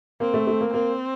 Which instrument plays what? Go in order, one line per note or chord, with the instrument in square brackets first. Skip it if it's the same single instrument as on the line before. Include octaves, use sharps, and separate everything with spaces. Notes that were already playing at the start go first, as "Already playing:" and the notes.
[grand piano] A#3 [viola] C4
[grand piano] A3
A3
A#3
[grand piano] A#3 [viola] C4